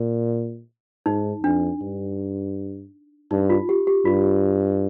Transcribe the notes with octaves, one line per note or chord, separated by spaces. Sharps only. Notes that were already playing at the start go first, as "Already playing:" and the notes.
Already playing: A#2
G#2 D#4
F2 D4
G2
G2 D#4
F4
G4
G4
G2 F4